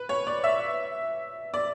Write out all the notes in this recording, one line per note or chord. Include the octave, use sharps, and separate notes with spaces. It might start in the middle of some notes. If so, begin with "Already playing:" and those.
Already playing: B4
C#5
D5
E5
D5